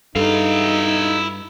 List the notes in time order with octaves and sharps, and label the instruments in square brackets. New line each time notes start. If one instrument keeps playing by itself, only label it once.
[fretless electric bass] G2 [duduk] D#4 [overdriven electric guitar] E4 F5 [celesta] A4